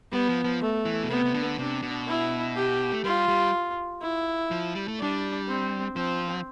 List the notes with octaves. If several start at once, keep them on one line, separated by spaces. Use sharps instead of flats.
G3 B3
F3
F3
A3
E3
B2
C3 B3
C3
D3
C3 D4
B2
E4
G4
A3
G3 F4
G3
E4
F3
G3
A3
G3 D4
C4
F3 C4